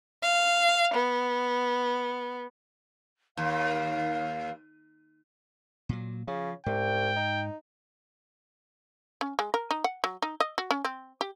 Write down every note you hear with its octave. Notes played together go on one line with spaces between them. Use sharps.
F5
B3
D#2 F5
A#2 F#3
C#3 F3
C2 G#2 G5
D#4
C#4
G#3
A#4
D#4
F#5
F#3
D#4
D#5
F#4
C#4
C4
G4